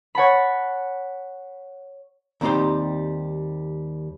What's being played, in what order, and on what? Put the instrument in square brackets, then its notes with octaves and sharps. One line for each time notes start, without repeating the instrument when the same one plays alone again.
[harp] C#5 F#5 A5 B5
[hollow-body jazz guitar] D#2 G3 C4 D#4 G4 C6